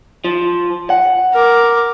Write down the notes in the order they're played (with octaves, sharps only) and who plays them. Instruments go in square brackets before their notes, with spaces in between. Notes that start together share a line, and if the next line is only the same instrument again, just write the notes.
[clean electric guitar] F3
F#5
[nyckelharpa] A#4 D6